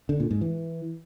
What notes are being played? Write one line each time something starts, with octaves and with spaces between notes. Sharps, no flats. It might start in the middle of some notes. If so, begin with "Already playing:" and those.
D3
A#2
G#2
E3